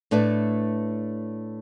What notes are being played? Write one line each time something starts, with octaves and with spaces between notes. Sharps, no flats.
A2 A3 D4 B4 E5